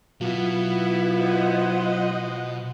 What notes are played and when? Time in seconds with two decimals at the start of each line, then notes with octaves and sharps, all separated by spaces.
0.21 B2 F#3 B3 E4 F4
1.18 C5 D#5 F#5